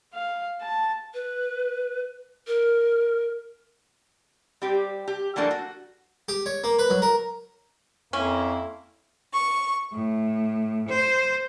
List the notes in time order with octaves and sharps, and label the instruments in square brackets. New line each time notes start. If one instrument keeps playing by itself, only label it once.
[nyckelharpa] F5
A5
[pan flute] B4
A#4
[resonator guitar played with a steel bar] G3 C4 G4
G4
E3 F#3 A3 A#3 D4 A4
F#4
[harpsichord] G4
C#5
A#3
B4
F#3
A#4
[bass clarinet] F2 [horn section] A#3 E4 [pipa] C#4
[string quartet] C#6
A2
C5